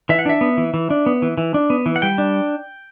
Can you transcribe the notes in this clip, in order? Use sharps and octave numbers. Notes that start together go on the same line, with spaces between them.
E3 E5
F#5
D4 E5
B3
E3
E3
D4
B3
E3
E3
D4
B3
E3
F#5
G3 G5
D4